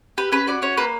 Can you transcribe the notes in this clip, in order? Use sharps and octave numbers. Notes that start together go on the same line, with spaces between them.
G4 B4
C#4 B4
F#4 D5
C#4 C#5
A#3 B4